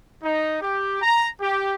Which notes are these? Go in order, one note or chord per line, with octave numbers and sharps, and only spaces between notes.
D#4
G4
A#5
G4